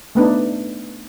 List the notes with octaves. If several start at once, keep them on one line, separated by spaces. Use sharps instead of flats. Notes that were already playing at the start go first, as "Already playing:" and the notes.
A3 B3 D4 D#4